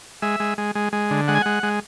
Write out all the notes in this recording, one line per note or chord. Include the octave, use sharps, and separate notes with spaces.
G#3 E5
G#3
G#3
G#3
G#3
D3
G#3 F#5
G#5
G#3 F#5
G#3